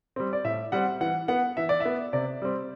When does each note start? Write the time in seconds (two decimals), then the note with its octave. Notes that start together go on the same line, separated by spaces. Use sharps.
0.16 G3 C4
0.33 D5
0.44 A2 E5
0.72 G3 C4 F#5
1.01 E3 F#5
1.28 B3 F#5
1.57 E3 E5
1.69 D5
1.80 E5
1.85 B3
2.13 C3 D5
2.42 G3 C4